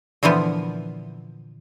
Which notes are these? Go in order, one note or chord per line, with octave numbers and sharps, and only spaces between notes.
A#2 D3 E3 F3 B3